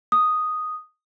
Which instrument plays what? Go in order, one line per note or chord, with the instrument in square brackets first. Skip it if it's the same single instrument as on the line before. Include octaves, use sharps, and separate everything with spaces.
[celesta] D#6